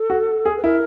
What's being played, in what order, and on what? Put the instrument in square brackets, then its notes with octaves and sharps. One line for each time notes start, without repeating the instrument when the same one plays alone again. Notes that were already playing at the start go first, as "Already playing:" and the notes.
Already playing: [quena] A4
[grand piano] F#4
G#4
[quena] B4
[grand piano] E4 [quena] A#4